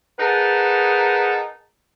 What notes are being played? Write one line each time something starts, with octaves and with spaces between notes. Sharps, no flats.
D#4 G#4 A#4 B4 F#5 A5